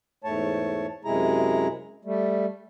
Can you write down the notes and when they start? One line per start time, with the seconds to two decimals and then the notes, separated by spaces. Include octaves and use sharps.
0.24 E2 G#2 A3 C#5 A5
1.05 F#2 C3 G#3 E4 G#4 A#5
2.05 G3 A3